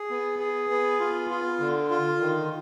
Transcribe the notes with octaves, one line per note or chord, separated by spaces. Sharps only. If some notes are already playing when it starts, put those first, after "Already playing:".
Already playing: G#4
B3
G#4
B3
F4
F4
D3
F4
D#3